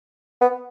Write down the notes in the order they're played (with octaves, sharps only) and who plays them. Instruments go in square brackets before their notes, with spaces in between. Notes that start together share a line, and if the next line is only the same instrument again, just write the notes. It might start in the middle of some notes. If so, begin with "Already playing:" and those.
[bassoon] B3